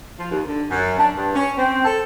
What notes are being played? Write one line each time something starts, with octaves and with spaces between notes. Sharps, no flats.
F3
D#2
D3
F#2
D4
G2
C#4
C4
A4